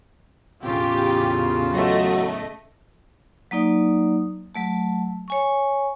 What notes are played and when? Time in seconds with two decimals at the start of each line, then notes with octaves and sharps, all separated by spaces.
0.63 E2 A2 C#3 F4 G4
1.73 F#3 A3 D#5
3.51 F#3 A#3 D#4 D5 D#6
4.55 F#3 A3 A5
5.28 C#5 G#5 C#6